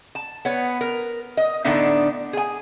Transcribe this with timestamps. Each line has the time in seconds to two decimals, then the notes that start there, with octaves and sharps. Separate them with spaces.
0.15 A5
0.45 B3 C#5
0.81 A#4
1.37 D#5
1.64 A2 D3 B3 D4 D#4 E5
2.33 G#4 G#5